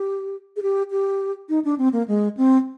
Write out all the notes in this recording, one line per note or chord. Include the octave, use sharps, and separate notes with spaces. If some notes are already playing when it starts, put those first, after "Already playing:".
Already playing: G4
G#4
G4
G4
D#4
D4
C4
A#3
G#3
C4